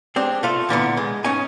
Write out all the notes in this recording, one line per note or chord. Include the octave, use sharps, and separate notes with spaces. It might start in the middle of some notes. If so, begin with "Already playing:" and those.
G#3 C4 D4 G4
A3 F4 A4
A#2 D3 E3 B3
G#3
G#2 C#4 D#4 D#5 G#5